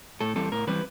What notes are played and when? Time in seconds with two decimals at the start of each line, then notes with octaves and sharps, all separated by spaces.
0.21 A2 A4
0.36 E3 G3 C4 A4
0.52 A2 A#4
0.67 E3 G3 C4 B4